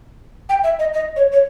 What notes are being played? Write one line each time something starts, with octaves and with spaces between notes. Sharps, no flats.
G5
E5
D#5
D#5
C#5
C#5